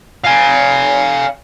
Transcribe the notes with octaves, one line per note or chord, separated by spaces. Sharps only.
F5 G#5